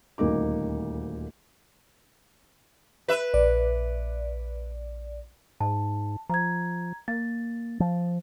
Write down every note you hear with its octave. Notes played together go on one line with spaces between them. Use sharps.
D#1 D2 A#3 D#4 D6
B4 E5
A#1 D5
G#2 A5
F3 A#5 G#6
A#3 A6
F3